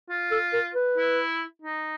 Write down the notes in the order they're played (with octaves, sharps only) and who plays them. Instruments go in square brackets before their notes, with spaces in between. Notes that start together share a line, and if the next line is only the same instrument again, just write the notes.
[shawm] F4
[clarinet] A4
A#4
B4
[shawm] E4
D#4